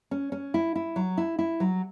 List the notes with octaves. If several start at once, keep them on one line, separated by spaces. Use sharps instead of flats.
C#4
C#4
E4
E4
F#3
E4
E4
F#3